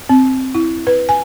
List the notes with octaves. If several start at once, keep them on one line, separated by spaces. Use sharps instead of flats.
C4
E4
B4
G#5